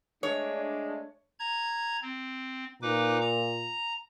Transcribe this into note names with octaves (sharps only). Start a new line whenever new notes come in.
G#3 A3 D4 C#5
A#5 G#6
C4
A#2 D#4 B4 D6
A#5